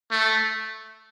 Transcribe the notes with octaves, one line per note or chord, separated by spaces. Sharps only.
A3